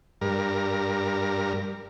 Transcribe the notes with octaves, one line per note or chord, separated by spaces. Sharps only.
G2 A#4